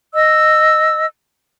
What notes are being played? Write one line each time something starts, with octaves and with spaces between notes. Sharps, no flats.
D#5 E6